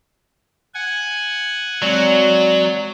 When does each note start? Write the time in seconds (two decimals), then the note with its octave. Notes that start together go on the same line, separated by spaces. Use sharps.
0.74 F#5 G#5
1.82 F#3 G#3 C4 D5